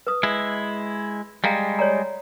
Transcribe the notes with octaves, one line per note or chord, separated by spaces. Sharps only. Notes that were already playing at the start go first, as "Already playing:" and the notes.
B4 D#6
G#3 E4
G3 G#3 F5 A#5
C#5 D5 A#5